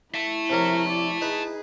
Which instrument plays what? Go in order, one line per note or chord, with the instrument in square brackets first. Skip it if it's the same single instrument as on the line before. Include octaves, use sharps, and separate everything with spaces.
[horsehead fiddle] E4 [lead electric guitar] E5 A5
[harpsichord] C3 F3 C#5 [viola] A#4
[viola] D5
[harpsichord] D#4 B4 [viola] G#4